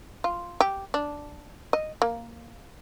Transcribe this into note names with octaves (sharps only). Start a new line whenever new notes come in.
F4
G4
D4
D#5
A#3